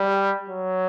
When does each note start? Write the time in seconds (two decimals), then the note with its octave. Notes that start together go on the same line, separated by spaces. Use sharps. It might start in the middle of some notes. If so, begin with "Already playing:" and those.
Already playing: G3
0.49 F#3